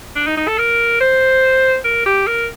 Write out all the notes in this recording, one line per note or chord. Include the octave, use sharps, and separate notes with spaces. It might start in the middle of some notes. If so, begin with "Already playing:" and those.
D4
D#4
D#4
A4
A#4
C5
A#4
G4
A#4